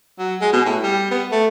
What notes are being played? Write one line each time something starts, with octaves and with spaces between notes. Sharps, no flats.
F#3
G#3
B2
A2
G3
B3
A3